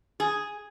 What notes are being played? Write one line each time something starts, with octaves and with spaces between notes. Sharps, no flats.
G#4